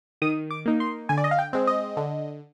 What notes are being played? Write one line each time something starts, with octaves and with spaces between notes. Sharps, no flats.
D#3 D#6
D6
A#3 D#4
C6
D3 G#5
D5
D#5
F5
G5
G#3 C4
D#5
D3